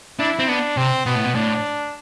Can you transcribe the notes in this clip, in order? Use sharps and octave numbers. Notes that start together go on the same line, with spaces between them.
D4 E4
C4
B3 D4
C3 C4
B2 B3
A2
B2
A2 D4